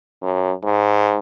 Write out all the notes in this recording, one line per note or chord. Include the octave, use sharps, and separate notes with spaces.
F#2
G#2